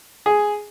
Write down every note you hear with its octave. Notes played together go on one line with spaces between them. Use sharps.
G#4